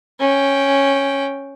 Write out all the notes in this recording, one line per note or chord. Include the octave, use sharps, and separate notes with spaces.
C#4 G5